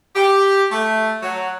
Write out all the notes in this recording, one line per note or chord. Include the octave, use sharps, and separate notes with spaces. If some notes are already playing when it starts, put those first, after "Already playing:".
G4
A3
F#3